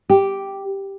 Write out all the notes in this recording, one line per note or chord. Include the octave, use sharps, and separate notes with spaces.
G4